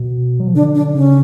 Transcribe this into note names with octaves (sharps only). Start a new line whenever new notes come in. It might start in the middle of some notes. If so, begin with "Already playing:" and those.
Already playing: B2
F#3
F3
D3 D4
D4
C#3 C#4